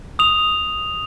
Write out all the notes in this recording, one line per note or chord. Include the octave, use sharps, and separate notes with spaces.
D#6 F7